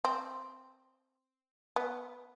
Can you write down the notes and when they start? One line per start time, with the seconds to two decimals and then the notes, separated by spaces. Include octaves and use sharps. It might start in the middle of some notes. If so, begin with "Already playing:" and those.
0.05 C4
1.76 B3